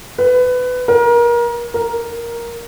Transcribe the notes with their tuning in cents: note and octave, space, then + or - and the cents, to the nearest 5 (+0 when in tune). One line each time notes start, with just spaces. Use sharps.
B4 +20
A#4 +30
A#4 +5